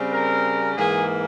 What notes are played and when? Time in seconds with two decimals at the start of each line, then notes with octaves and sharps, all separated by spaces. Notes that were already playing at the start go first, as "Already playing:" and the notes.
Already playing: C#3 G3 C4
0.11 A#4
0.76 G#2 E3 A#3 G#4